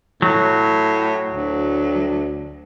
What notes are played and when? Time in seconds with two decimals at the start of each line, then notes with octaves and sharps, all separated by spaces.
0.22 A2 F#3
1.32 D2